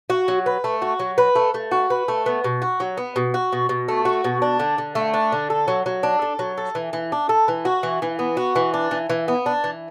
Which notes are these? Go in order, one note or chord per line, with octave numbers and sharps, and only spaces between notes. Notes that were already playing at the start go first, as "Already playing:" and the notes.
F#4
F#3
B4
A3
F#4
F#3
B4
A3
A3
F#4
B4
A3
B3
B2
F#4
F#3
B3
B2
F#4
B2
B2
A3
F#4
B2
D4
D3
D3
A3
D4
D3
A4
F#3
F#3
D4
A4
F#3
A4
E3
E3
D4
A4
E3
F#4
E3
E3
B3
F#4
E3
D4
E3
E3
B3
D4
E3